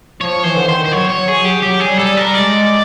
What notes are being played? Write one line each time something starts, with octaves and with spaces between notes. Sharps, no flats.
F3 C#5
E3 C5
D3
D#3 C5
C5
F#3 C#5
C#5
F#3
G#4
F#3
G4
F#3 G4
G#4
G3
A4
G3
A#4
G#3 D5